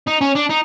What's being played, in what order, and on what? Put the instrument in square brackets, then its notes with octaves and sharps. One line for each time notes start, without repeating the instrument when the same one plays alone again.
[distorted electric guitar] D#4
C#4
D4
D#4